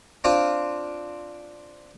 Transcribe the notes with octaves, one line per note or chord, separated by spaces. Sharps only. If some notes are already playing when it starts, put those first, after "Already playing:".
C4 D4 F4